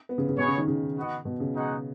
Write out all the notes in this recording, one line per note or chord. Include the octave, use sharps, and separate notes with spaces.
B3
C#3
C#3
B2 B3 G#4 C#5
C#3
D#3
C#3
B3 F#4 D#5 F#5
B2
C#3
G#3 D#4 F#4 D#5 F#5